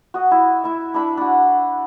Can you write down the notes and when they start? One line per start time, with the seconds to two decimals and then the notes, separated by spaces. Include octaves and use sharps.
0.14 F#4 D#5
0.31 E4
0.64 E4 E5
0.94 D4 E4 B5
1.17 D4 F#4